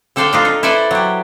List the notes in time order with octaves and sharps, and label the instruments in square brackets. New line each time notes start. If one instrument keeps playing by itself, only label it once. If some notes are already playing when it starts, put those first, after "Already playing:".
[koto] D3 A4 C5 D5 F5 G5
D4 D#4 F4
D#4
E4 A4 B4 C5 D5 E5
F#3 G4